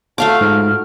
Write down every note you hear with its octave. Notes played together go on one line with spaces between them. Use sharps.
F3 F#3 A3 F#4 F5 A5 D6
G#2 F6